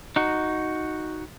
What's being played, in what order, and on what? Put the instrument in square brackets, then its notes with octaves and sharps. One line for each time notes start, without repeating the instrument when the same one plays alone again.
[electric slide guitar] D#4 F#4